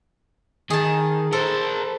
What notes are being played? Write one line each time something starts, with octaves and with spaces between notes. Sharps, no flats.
D#3 G#4 A5
A4 A#4 C5